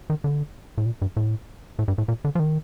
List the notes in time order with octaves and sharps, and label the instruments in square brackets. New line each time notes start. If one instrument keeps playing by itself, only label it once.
[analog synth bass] D#3
D3
A2
A#2
G2
A2
A2
G2
A2
A#2
D3
F3
D#3